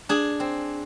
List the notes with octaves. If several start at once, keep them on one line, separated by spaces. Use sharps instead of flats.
D4 G#4
C4